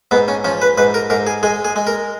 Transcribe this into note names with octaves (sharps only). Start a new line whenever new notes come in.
G#2 B3
C#4
F3 C#4
B4
G#2 B4
A#4
G#2 A#4
G#4
G#3 G#4
G#4
G#3
A#4